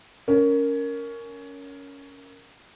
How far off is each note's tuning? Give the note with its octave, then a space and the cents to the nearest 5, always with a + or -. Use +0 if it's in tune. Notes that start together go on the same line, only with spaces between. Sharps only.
C#4 +15 A#4 -5